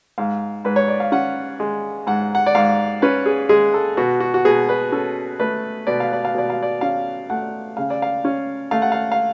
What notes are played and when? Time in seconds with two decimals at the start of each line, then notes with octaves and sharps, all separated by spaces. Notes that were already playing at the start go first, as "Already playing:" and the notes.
0.18 G#2 F5
0.65 G#2 B4
0.76 C#5
0.88 D5
1.00 F5
1.12 C#4 F#5
1.60 G#3
2.07 G#2 F#5
2.35 F#5
2.46 D5
2.55 G#2 F5
3.02 C#4 B4
3.26 G#4
3.49 G#3 G#4
3.74 A4
3.97 B2 F#4
4.20 F#4
4.34 F#4
4.45 B2 G#4
4.69 B4
4.92 C#4 A4
5.40 A3 B4
5.87 B2 D5
6.00 F5
6.13 D5
6.25 F5
6.34 B2 D5
6.50 F5
6.63 D5
6.81 C#4 F5
7.30 A3 F#5
7.77 C#3 F5
7.90 D5
8.02 F5
8.25 C#4
8.71 A3 F5
8.82 F#5
8.92 F5
9.12 F5